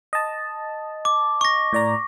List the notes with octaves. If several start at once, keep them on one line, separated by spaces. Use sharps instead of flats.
D#5 A5
D6
C#6 A#6
A2 D5 A#5